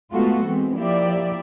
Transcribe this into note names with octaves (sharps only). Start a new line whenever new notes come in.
G#3 A3 B3 F4 F#4 A4
E3 G#3 B3 C4
F3 A#3 E4 G4 D5 E5